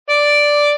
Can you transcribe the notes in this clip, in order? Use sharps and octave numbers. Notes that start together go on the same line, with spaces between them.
D5